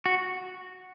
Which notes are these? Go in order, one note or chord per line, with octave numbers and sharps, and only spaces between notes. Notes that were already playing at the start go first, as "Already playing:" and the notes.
F#4